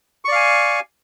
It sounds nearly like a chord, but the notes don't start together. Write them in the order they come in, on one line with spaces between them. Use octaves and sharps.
C#6 D5 F5 G#5